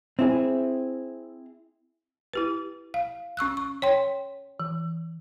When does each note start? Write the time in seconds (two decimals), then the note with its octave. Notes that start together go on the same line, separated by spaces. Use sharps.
0.19 C4 E4 G#4
2.33 E4 G4 B4
2.94 F5
3.37 C#4 C#6 E6 F#6
3.57 C#6
3.82 C#5 G5 C6
4.60 E3